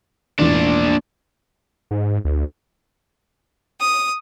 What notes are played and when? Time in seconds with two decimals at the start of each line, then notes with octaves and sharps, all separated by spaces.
0.39 E1 A1 A#2 D4
1.91 G#2
2.25 D2
3.79 D#6